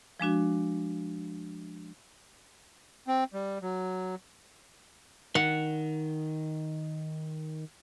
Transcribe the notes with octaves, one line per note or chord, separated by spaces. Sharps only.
F3 G#3 D4 F#4
C4
G3
F#3
D#3 F#5